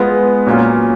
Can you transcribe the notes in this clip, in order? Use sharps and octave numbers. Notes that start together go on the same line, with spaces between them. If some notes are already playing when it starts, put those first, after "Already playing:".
Already playing: G#3 B3 F4 B4
A#2 F#3 C#4 F4